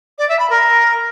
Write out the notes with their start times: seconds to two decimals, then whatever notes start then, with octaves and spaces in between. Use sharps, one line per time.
0.18 D5
0.29 E5
0.39 B5
0.50 A#4